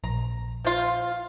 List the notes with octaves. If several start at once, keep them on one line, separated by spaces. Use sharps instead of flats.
A#1 A#5
F3 F4